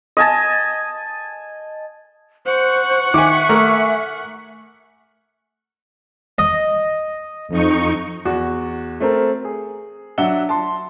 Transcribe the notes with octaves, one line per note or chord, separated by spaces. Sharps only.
D#5 G#5 A5
C5 F#5 C#6
D#3 E5 G#5 D6
A3 A#4
D#5
F2 D#4 C#6
E2 F#4
A3 C4 A#4
G#4
F#3 D4 E5 F#5 G7
A5 C6